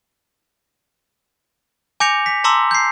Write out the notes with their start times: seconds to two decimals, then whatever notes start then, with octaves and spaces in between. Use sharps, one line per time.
2.00 G#5 D6 G6 A#6 C#7 F7
2.26 B6
2.44 A5 A#5 C6 D6 E6
2.71 G6 C7